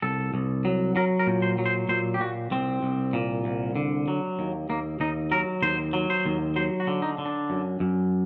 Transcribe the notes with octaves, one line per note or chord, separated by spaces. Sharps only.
C2 A4
C2
F#3
F#3 A#4
A#4
A#2
C5
F#3
C5
A#2 C5
G4
A#2 F#4
C2 C4
C2
A#2
C2
D3
F#3
D#2
D#2 A#3
D#2 D#4
F#3 A#4
D#2 C5
F#3
C5
D#2
F#3 C5
F#4
D3
D#4
D3
D4
F#2
F#2